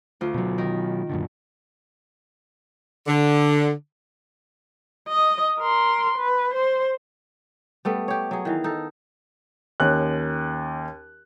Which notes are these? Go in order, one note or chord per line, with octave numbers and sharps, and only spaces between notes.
D2 F4
B2 F#3
D#3
F#2 A#2 D3
D3
D#5
A#4 C6
B4
C5
G3 A3 B3
G4 C#5
F#3 G#4
D#3 E3 F5
D#4 A4
D#2 C#4 F#6